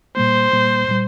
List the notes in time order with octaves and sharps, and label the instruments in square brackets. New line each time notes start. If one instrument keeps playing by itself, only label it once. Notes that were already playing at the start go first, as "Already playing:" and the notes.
[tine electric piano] A#2 G3 A#3 [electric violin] C5
[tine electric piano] A#2 G3 A#3
A#2 G3